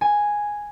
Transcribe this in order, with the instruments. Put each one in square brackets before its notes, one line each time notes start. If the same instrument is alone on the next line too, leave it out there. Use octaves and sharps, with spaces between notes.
[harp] G#5